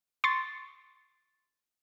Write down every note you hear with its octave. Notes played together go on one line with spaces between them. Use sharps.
C6 C#6 A6